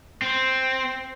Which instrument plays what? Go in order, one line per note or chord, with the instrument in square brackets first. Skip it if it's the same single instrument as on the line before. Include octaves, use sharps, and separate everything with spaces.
[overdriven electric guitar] C4